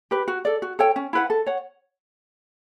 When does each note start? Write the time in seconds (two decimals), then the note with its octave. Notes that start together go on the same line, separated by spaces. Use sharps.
0.11 G4 B4
0.28 F#4
0.45 A4 D5
0.62 F#4
0.79 A4 C#5 G5
0.96 C#4
1.13 E4 B4 F#5
1.30 A4
1.46 C#5 F#5